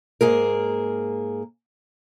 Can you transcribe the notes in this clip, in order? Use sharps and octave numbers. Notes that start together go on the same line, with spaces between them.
G#2 A#3 G#4 A#4